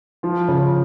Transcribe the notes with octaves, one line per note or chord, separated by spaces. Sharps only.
F3 F4
C#3